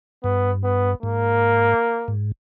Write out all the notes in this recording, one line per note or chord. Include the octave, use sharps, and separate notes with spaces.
G2 B3
B3
G#2 A#3
G#2